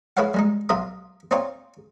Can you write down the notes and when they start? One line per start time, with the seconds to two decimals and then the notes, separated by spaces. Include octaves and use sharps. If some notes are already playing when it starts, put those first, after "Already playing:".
0.17 E4 G#4 B4 C#5 F5 F#5
0.34 G3 G#3 D#4
0.69 B1 F4 E5 A#5 D#6
1.31 C4 D#4 F4 C#5 D5 G5